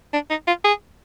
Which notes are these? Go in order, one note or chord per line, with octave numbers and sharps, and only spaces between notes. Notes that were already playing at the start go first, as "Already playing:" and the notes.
D4
D#4
F4
G#4